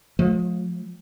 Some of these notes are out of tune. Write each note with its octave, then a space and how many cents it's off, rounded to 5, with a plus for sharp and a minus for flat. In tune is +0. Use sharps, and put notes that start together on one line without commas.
F3 +35 A3 -30